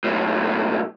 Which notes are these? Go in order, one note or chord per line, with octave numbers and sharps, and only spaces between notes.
B1 A2